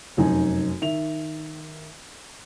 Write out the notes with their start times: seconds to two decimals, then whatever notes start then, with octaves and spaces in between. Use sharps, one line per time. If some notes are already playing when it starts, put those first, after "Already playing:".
0.17 F1 F#2 D#4 G#5
0.82 D#3 E5 F7